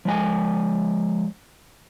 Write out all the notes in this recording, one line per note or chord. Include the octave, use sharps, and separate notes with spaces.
F3 G#3 G#5